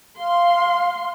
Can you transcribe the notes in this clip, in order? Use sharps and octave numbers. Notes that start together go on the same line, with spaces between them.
F5 C6